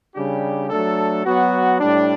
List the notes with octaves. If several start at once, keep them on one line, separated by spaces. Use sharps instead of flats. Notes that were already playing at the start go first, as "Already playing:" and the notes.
C#3 G3 D4 G4
F#3 A3 D4 A4
F#3 B3 F#4
A2 G3 D4